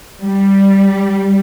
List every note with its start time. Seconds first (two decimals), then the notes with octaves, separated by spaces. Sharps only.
0.24 G3